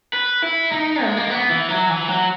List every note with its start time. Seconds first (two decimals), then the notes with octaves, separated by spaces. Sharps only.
0.13 B4
0.42 E4
0.71 D#4
1.04 G#3
1.17 A#3
1.30 B3
1.50 E3
1.69 F#3
1.89 E3
2.08 F#3